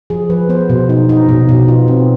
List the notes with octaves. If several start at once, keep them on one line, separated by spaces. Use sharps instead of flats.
F3 G#4
F3 B4
B3 C5
B2
D#4
D#4
B2
B2
F4
C4